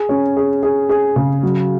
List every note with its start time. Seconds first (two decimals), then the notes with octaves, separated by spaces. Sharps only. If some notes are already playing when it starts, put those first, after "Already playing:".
Already playing: G#4
0.09 C#4
0.36 G#4
0.63 G#4
0.89 G#4
1.16 C#3
1.43 F#3